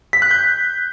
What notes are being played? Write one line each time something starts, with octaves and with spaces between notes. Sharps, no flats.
B6
F#6
G6